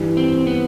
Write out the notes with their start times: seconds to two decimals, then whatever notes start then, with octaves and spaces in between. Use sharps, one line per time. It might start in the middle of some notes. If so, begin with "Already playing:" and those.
Already playing: G2 E3 G3
0.17 C4
0.47 B3